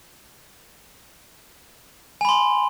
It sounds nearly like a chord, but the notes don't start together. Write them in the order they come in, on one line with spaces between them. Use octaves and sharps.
G#5 B5 C6